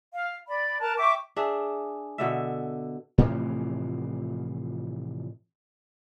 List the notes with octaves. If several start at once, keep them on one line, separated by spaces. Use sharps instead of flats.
F5
D5 B5
A#4 A5 F#6
E5 G5 C#6 D6
D4 G#4 E5
B2 D3 E5
A2 C3 E3 F3